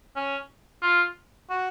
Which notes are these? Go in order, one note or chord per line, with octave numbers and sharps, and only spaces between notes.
C#4
F4
F#4